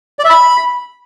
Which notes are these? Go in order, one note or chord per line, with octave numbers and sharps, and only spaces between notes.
D5
E5
B5